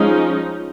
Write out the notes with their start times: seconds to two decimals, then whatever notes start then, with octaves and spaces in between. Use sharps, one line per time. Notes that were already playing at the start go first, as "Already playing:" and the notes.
Already playing: F3 G#3 C#4 D#4